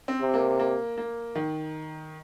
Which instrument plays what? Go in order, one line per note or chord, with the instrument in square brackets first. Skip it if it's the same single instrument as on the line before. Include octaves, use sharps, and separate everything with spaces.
[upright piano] C4
[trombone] C3
[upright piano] A#3
A#3
A#3
D#3